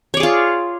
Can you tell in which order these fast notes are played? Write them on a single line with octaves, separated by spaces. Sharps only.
C#5 D5 G#4 F4